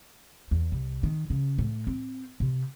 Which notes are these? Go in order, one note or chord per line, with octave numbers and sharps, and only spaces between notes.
E2
C2
D#3
C#3
A2
C4
C3